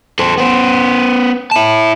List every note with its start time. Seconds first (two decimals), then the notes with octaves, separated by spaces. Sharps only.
0.19 A4 C5
0.38 B3 C5
1.51 E4 A5